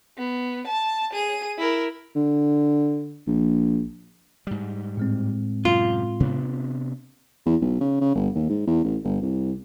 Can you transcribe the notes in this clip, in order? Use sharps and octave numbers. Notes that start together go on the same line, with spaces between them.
B3
A5
G#4 D#7
E4 A#4
D3
A#1
G#2 G3
A2 G#3 C4
F#2 C3 F4
C3 B3 D4
E2
B1
C#3
C#3
G1
D#2
G#2
E2
A1
G1
C2